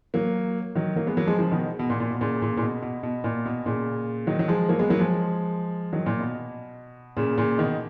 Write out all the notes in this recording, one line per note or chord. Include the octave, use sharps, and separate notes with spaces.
F#3 A#3
D#3 F#3
F#3 A#3
G#3 B3
F#3 A#3
F3 G#3
C#3 F3
B2 D#3
B2
A#2
A#2
B2
A#2 C#3
A#2 C#3
A#2
B2
B2
B2
A#2
B2
A#2 C#3
D#3 F#3
F#3
F3 G#3
F#3 A#3
G#3 B3
F#3 A#3
F3 G#3
D#3 F#3
A#2
B2
A#2 C#3
A#2 C#3
B2 D#3